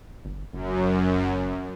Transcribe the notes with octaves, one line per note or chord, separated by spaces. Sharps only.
G1
F#1 F#2